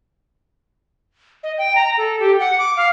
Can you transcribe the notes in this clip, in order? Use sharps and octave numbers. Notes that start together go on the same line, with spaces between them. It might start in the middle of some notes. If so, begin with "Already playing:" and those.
D#5
G5
A#5
A4
G4
F#5
D6
F5